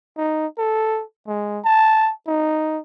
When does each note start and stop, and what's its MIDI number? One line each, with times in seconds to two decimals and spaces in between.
0.18 0.47 63
0.58 1.03 69
1.27 1.59 56
1.64 2.11 81
2.28 2.79 63